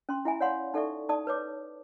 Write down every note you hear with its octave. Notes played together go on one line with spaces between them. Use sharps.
C#4 C6
E4 E5 G#5 B5
C#5 D5 F5 F#5 B5 C6
D#4 A4 D5 E5 C#6
D#4 D5 A5 D#6
B4 C#5 D6